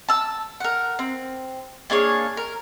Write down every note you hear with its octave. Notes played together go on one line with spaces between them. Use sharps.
A5 E6
A#4 F#5
C4
A#3 D4 G#4 C#5
A#4